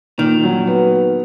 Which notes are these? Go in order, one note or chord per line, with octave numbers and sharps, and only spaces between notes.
A#2 D#3
F#3
B3